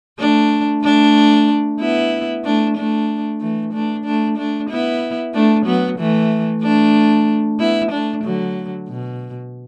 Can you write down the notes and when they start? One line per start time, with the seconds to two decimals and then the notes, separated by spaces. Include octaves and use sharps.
0.19 A3 D4
0.83 A3 D4
1.80 B3 E4
2.45 A3 D4
2.77 A3 D4
3.41 E3 A3
3.73 A3 D4
4.05 A3 D4
4.38 A3 D4
4.70 B3 E4
5.34 A3 D4
5.66 F#3 B3
5.98 E3 A3
6.63 A3 D4
7.59 B3 E4
7.91 A3 D4
8.24 D3 F#3
8.88 B2